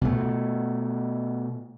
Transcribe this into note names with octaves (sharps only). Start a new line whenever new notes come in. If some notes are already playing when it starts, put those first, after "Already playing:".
B2 A3